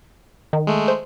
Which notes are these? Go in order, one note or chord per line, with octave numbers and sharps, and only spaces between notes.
D#3
G#3 A3
C5